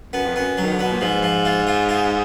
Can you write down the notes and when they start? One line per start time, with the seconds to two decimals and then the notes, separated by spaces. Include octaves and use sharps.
0.13 F#2 B3
0.25 F2
0.36 F#2 B3
0.58 F#3
0.64 D#3
0.73 D3
0.79 B2 B3
0.92 A#2
1.01 G#2 F3
1.23 F3
1.45 F4
1.67 F4
1.89 F4